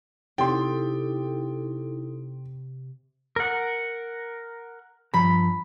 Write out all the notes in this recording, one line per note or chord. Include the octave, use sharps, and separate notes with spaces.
C3 D#4 E4 A4 G5 C6
A#4 F#5
G2 F3 A#5 B5